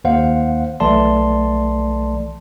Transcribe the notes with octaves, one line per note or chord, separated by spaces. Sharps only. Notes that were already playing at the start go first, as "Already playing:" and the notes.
D#2 C5 F5 F#5
B1 E3 A3 D5 A5 C6